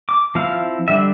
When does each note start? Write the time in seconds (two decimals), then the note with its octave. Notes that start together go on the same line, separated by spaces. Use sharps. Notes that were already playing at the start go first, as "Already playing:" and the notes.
0.09 D6
0.35 F3 C4 E4 F5
0.88 D3 G3 D4 E5